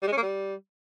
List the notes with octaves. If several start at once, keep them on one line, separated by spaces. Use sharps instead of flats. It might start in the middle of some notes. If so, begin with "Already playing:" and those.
G3
G#3
C#4
A#3
G3